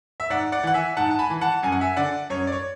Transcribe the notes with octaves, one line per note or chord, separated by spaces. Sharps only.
E5
G#2 D5 F#5
D5 F#5
E3 F#5
E5 G#5
G#2 F#5 A5
A5
G#5 B5
E3
F#5 A5
F#2 G#5
F#5
E5 G#5
D3 D5 F#5
F#2 C#5
D5
C#5